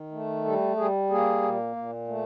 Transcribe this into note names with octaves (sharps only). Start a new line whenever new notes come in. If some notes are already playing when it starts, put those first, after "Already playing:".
Already playing: D#3
A3
G3 A4
G3 G#4
A#3 G#4
A#2
A#2
A3